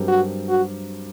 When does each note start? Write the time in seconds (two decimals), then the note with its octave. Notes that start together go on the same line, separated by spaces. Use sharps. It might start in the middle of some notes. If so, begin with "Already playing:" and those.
Already playing: G2 F#3 C4 G4 A#4
0.08 F#4
0.49 F#4